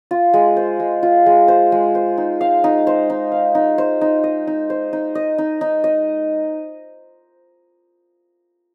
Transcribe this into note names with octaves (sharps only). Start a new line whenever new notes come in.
F4
G#3
C5
G#3
F4
G#3
C5
G#3
C5
D#4
F5
D#4
C5
D#4
F5
D#4
C5
D#4
D#5
D#4
C5
D#4
D#5
D#4
D#4
D#5